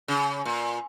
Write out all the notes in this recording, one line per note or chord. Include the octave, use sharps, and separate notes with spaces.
C#3
A#2